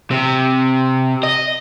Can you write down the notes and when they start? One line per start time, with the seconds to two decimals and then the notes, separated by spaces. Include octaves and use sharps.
0.11 C3
1.23 D#5